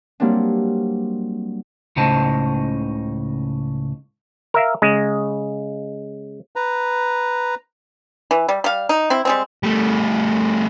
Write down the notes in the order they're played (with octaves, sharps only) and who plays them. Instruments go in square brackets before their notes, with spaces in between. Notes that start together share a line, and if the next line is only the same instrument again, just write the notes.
[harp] F#3 G3 A#3 C4 D4
[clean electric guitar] C#2 A2 C#3 D#4 C5 A5
[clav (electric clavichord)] A#4 E5 F5
C#3 G#3
[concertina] B4 A#5
[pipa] E3
G3
G3 F5
D#4
C4 E4
G3 G#3 C4
[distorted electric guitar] G3 A3